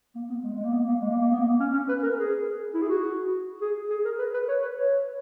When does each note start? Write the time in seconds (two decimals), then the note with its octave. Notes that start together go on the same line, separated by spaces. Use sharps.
0.15 A#3
0.30 B3
0.44 G#3
0.54 G#3
0.64 A#3
0.73 B3
0.88 A#3
1.02 G#3
1.11 A#3
1.22 A#3
1.31 B3
1.40 A#3
1.60 C#4
1.73 C#4
1.88 B4
2.03 A#4
2.17 G#4
2.74 E4
2.82 G#4
2.89 F#4
3.61 G#4
3.90 G#4
4.05 A#4
4.19 B4
4.34 B4
4.48 C#5
4.62 B4
4.77 C#5